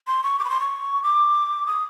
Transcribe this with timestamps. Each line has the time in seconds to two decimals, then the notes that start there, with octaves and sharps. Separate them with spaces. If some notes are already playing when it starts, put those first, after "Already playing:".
0.07 C6
0.24 C#6
0.39 D6
0.45 B5
0.50 C6
0.60 C#6
1.03 D6
1.67 D#6